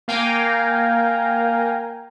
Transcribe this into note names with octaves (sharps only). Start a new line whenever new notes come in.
A#3 F5 G5 G#5 A#5